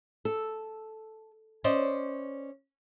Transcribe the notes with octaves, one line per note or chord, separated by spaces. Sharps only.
A4
C#4 C5 D5 D#5